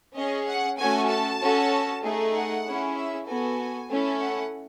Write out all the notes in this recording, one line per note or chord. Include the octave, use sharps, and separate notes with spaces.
C#4 G#4 D#5
F#5
A3 C#4 F#4 A4 G#5
A5
C#4 F#4 A4
A3 D#4 G#4
F#5
C#4 E4 G#4
E5
B3 F#4 A4 G#5
A3 C#4 E4 A4
F#5